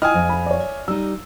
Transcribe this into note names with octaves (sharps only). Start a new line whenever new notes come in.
E4 F4 D#5 G5 G#5 D#6 F6
F2
B5
C#5 D5
E5
G3 D#4 E6